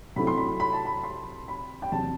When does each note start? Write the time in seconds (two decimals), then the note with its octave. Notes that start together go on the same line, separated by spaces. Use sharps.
0.16 C3 F#3 A3 C4 E4 B5
0.27 C6
0.37 B5
0.60 B5
0.73 A5
0.85 B5
1.03 C6
1.48 B5
1.82 G5
1.92 E2 C3 F#3 A5